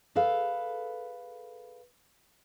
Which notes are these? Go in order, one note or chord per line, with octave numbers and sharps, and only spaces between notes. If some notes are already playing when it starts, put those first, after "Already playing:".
G#4 A4 B4 F5